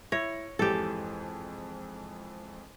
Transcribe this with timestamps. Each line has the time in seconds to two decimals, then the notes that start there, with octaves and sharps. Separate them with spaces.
0.12 E4 C#5 A#6
0.59 F2 G#2 E3 G4 A4